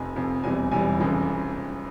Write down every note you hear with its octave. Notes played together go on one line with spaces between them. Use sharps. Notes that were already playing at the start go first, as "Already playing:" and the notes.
Already playing: F1 F2 C3 G#5
F1 F2 C3
E1 E2 C3 E3 G3 G#5
E1 E2 C3 E3 G3 G#5
F1 F2 C#3 E3